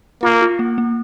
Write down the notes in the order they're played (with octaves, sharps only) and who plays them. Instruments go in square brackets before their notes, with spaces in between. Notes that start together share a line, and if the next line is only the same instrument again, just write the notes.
[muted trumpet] A#3 [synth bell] F4
[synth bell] F4
A#3
A#3